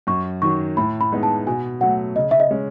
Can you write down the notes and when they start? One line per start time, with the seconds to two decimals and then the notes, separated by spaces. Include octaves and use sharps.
0.07 F#2 C#6
0.42 D#3 F#3 C#6
0.77 A2 B5
1.01 B5
1.12 G#3 B3 D#4
1.23 A5
1.47 B2 G#5
1.81 F#3 A3 F#5
2.16 C#3 D#5
2.31 E5
2.40 D#5
2.51 G#3 C#4